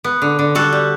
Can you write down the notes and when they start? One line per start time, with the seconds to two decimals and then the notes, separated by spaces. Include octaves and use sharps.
0.04 B3
0.22 D3
0.39 D3
0.55 G3 F#4 A4
0.72 G3